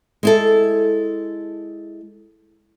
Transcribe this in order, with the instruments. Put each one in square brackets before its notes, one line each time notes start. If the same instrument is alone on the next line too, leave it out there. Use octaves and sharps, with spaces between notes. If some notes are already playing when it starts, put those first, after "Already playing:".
[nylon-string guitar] G#3 E4 A4